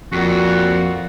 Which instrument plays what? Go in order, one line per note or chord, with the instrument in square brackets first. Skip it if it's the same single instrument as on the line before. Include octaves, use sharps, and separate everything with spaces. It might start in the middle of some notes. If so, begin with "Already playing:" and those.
[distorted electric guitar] F2 [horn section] A#2 F#4